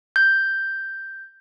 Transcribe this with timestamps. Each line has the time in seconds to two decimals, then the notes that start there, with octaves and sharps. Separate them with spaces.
0.16 G6